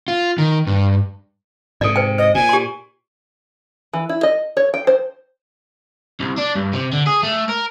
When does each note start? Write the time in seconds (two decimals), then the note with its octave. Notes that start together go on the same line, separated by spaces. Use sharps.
0.08 F4
0.38 D#3
0.67 G2
1.81 G#2 C3 A4 D5
1.96 C5 G5
2.18 C5 D#5
2.35 A#2 G#5
2.49 G4 C6
3.93 E3
4.09 E4
4.23 D#5
4.57 C#5
4.74 G5
4.87 C5
6.20 C2
6.38 D4
6.56 G2
6.73 C3
6.93 D3
7.07 G#4
7.23 A3
7.49 A#4